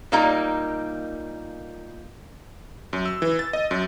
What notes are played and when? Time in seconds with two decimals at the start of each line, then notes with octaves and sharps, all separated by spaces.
0.12 A#2 G3 A#3 D#4 A#5
2.93 F#2
3.05 E6
3.22 E3
3.39 A6
3.53 D#5
3.71 F#2